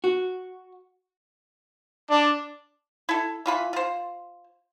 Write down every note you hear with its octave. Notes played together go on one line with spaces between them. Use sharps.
F#4
D4
E4 A4
E3 F4 B5
F4 C5